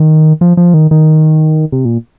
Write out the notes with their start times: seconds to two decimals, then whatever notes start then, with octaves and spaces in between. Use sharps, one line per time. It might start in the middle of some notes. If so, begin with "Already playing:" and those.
Already playing: D#3
0.41 F3
0.57 F3
0.74 D#3
0.91 D#3
1.72 C3
1.85 A#2